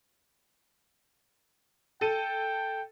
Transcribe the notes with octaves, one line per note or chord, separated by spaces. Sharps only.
A4 G5 D#7